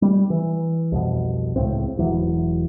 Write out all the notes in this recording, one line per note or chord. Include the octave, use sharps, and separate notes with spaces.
G3
E3
C2 F2 B2
C#2 A2 C4
E1 E3 F#3